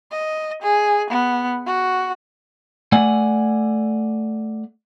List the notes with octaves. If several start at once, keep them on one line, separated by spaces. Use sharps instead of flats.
D#5
G#4
B3
F#4
A3 D5 F#5 G#5